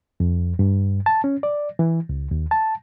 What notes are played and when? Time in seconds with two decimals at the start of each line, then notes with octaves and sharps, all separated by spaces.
0.20 F2
0.59 G2
1.06 A5
1.24 C#4
1.43 D5
1.79 E3
2.09 C#2
2.31 D#2
2.51 A5